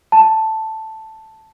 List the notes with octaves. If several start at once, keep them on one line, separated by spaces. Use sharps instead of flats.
A5